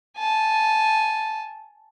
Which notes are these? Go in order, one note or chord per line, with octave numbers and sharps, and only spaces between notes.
G#5 A5